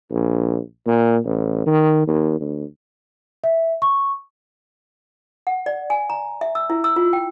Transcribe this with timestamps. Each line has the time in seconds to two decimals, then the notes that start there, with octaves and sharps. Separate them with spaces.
0.11 A#1
0.87 A#2
1.25 A1
1.66 D#3
2.08 D#2
2.40 D2
3.44 E5
3.82 C#6
5.47 F#5
5.66 D5
5.90 G#5
6.10 A#5
6.41 E5
6.55 E6
6.70 E4
6.84 E6
6.96 F4
7.13 G5